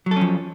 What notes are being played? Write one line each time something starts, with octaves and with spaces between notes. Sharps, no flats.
F3 F#3 C#4 A4